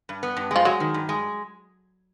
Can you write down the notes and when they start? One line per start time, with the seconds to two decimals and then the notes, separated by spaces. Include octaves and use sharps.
0.09 G2
0.23 B3
0.37 G2
0.51 F3 G#3
0.65 F#3 G#3
0.80 D#3
0.94 G2
1.09 G#3